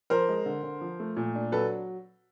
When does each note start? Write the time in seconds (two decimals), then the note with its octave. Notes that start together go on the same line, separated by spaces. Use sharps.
0.10 F3 A#4 C5
0.29 G#3
0.46 D3
0.63 D3
0.81 F3
1.00 A3
1.17 A#2
1.35 D4
1.52 F#3 A4 B4